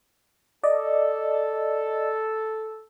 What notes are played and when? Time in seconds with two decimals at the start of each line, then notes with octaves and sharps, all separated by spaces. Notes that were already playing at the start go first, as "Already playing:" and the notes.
0.63 A4 D5 D#5